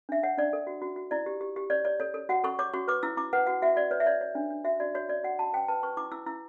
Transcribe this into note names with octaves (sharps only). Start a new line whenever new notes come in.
D4 E5
C#5 F#5
D4 D5
A4
F#4
F#4
F#4
E4 D5
G4
G4
G4
C#5 D5
C#5 D5
A4 C#5
A4
F#4 F#5
A4 C#6
C#5 D6
F#4 C#6
B4 D6
E4 E6
E4 D6
B4 F#5
F#4 F#5
F#4 E5
F#4 D5
B4 C#5
E5
C#5 D5
C#5
D4
D4
F#4 E5
F#4 D5
F#4 C#5
F#4 D5
F#4 F#5
F#4 A5
B4 G5
B4 A5
B4 C#6
E4 D6
E4 E6
E4 E6